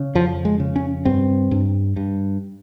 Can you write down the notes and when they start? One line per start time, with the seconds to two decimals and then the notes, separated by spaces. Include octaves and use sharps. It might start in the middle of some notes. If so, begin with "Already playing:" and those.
Already playing: C#3
0.15 F2 F3
0.45 G#3
0.60 C#3
0.76 C#4
1.05 G2 C4
1.51 G2
1.96 G2